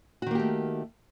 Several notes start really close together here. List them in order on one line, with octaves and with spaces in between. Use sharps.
F#4 D#3 A#3 G4 A3